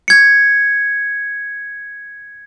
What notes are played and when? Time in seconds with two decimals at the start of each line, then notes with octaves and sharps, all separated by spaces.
0.08 G#6 C#7